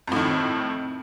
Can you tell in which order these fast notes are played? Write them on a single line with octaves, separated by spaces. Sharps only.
F2 A2 D#3